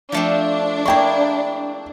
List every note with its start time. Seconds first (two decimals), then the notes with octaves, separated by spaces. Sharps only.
0.12 F3 A3 C4 D4
0.86 A#3 E4 G#4 G5 C#6